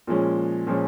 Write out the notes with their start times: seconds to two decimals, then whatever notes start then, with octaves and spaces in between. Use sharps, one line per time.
0.07 A#2 F3 G#3 C#4
0.67 A#2 F3 G#3 C#4